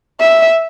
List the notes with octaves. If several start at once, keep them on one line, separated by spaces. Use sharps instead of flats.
E5